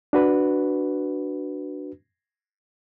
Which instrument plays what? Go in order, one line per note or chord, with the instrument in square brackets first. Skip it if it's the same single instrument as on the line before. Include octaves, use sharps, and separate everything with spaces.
[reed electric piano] D4 F#4 B4